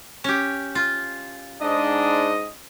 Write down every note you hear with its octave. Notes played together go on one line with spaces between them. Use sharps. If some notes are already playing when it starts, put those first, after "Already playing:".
C#4 G4
F4
G#2 D4 D#5